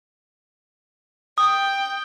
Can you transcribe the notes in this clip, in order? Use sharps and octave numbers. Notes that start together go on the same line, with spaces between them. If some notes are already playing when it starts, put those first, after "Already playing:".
G5 D#6